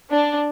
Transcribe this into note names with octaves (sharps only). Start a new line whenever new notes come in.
D4